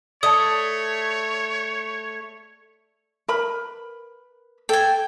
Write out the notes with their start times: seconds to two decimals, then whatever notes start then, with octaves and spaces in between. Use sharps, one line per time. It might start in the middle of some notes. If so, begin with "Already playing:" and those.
0.23 A3 C#5 D5 A5 D#6
3.28 A#4 B4 B5
4.69 A4 G5 G#5